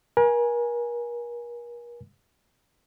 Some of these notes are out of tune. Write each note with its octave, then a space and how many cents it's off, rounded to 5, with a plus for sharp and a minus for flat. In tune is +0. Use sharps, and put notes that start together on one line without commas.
A#4 +40 G#5 +0